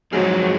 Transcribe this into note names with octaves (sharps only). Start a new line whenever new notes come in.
F3 F#3 G#3 C4 D#4 G#4